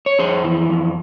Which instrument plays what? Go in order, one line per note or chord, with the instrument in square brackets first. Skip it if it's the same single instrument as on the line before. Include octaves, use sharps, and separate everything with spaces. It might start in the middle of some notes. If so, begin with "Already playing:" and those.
[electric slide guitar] C#5
F2 G#4 C5
E3
F2